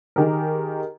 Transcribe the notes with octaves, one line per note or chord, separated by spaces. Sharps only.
D#3 G4 G#4 A#4